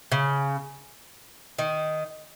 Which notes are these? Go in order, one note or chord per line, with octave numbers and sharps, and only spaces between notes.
C#3
D#3